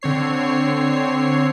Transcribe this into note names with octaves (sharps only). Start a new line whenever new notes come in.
D3 C4 C#5 C7